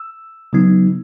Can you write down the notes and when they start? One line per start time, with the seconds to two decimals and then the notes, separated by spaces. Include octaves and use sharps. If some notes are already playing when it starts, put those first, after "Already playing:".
Already playing: E6
0.53 C#3 F#3 B3 D#4